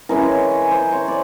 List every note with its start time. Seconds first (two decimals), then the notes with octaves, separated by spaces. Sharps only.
0.09 E3 G#3 C#4 A#4
0.71 C5
0.92 C#5
1.08 D5